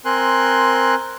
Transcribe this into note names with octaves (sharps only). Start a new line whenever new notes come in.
C4 A#4 G#5 C6 F#6